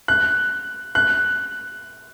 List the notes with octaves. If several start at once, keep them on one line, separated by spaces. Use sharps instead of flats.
F#6
F#6